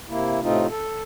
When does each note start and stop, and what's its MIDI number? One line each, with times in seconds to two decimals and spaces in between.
0.08 0.40 48
0.08 0.40 58
0.08 0.40 64
0.41 0.67 45
0.41 0.67 48
0.41 0.67 57
0.41 0.67 60
0.41 0.67 63
0.41 0.67 65
0.69 1.03 69